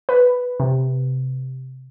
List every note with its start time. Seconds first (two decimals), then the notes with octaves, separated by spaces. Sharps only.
0.09 B4
0.60 C3